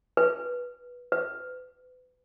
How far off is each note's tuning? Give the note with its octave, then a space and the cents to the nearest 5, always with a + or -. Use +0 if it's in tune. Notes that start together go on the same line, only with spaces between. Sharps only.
B4 -20
B4 +35